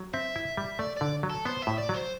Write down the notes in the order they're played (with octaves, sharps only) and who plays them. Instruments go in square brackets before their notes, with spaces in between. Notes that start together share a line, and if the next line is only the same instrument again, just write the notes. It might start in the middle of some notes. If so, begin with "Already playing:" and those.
Already playing: [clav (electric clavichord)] F#3
[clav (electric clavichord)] C4 [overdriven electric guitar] E5
[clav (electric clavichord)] E4
G3
[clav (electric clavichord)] A3 [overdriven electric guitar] D5
[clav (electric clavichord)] D3 [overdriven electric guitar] D5
[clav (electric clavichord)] F#3
[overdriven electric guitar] A4
[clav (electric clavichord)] B3 [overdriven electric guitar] C5
[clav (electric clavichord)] A2 [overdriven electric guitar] E5
[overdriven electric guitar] D5
[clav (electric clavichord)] F#3 [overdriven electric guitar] C5